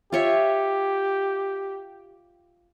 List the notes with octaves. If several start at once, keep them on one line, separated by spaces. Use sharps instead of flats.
F4 G4 C#5 E5